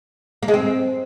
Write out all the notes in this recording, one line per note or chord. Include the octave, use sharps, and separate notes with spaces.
A#3
G#3
C4